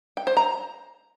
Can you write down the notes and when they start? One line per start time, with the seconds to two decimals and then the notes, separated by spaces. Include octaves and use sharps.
0.17 G5
0.27 C5
0.37 A#5